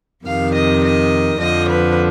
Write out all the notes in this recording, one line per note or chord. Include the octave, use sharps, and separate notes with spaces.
F2 C3 D#3 F5
D#5
D#5
F2 D3 F3 D#5
B4